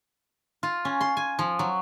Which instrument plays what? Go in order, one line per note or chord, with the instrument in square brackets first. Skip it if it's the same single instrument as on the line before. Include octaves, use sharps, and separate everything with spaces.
[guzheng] F4
C#4
C6
G#5
F3
F#3